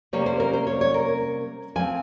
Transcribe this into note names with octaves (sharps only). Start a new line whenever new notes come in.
C3 G3 A#3 C#4 C#5
C5
A#4
C5
C#5
C#5
A#4
F3 C4 G#5